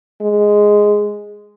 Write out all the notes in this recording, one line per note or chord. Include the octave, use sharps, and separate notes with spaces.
G#3